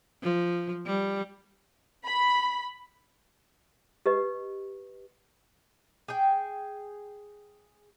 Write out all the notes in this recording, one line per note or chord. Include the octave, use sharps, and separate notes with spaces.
F3
G3
B5
G4 B4 D#5
G#4 G5